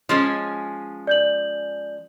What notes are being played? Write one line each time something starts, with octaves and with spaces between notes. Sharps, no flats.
F3 G#3 C#4
D5 G6 F#7